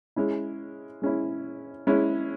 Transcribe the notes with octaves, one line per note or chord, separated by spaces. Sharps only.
G#3 C#4 E4
G#3 C#4 E4
G#3 C#4 E4